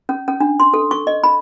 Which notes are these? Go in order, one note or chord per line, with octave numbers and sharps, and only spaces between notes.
C#4
C#4
D4
C6
A4
C#6
D#5
B5